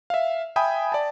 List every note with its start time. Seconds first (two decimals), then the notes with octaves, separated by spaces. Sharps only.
0.10 E5 F5
0.56 E5 G5 G#5 B5 D#6
0.92 D5 A5